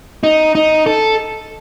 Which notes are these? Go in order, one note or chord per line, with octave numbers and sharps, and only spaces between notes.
D#4
D#4
A4